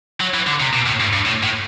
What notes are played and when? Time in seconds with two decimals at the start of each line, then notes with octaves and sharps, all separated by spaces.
0.20 F#3
0.34 E3
0.47 D3
0.60 C3
0.74 B2
0.86 A2
1.00 G2
1.13 G2
1.25 A2
1.43 A2